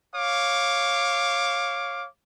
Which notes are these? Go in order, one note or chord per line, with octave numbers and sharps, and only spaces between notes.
C#5 F5 D6